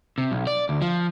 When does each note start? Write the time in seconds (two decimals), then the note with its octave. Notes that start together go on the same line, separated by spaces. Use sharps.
0.18 C3
0.32 B1
0.47 D5
0.69 D2
0.82 F3